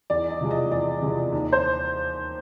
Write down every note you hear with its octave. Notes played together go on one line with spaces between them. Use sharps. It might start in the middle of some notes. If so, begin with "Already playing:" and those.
E2 D5
D#5
C3 F3 G#3
D#5
E2 D5
C3 F3 G#3
D#2
C5